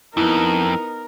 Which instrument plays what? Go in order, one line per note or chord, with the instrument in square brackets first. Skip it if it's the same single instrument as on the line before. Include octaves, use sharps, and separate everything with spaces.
[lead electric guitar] F2 [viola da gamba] B3 D#4 [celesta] E4 [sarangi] A#4